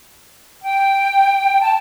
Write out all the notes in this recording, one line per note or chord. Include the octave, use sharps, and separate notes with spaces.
G5
A5